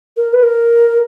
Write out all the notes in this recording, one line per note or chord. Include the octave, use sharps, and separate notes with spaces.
A#4
B4
A#4